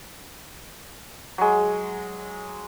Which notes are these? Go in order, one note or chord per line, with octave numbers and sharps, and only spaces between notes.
F#3 G#3